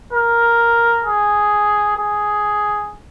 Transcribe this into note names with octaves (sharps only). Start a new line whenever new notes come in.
A#4
G#4
G#4